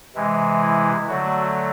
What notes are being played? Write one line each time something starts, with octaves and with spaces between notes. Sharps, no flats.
C3 E3 G#3
E4
D3 F#3 A3 F#4